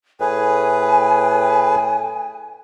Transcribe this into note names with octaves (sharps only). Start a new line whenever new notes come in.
A2 G#4 B4 G#5